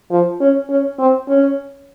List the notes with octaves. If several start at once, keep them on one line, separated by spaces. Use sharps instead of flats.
F3
C#4
C#4
C4
C#4